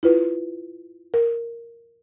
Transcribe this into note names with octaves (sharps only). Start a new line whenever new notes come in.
E4 F4 B4
A#4